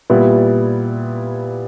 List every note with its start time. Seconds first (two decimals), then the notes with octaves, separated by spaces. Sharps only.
0.10 A#2 G3 B3 E4